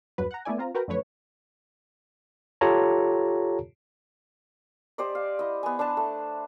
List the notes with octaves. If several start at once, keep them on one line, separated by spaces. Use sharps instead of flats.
E2 G2 F#3 B4
F#5 A#5
A3 B3 E4 D5 G#5
C4 F4 A#5
F#4 A#4 B4 G5 A#5
F#2 D3 F3 A3 B4 C#5
F4 G4 A4 C#5 A5 A#5
G4 C5 D5 D#5
F5
E4 D#5
B3 G#5
D4 B4 C5 A5
A3